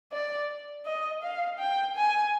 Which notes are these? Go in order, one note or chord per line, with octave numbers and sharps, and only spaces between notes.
D5
D#5
F5
G5
G#5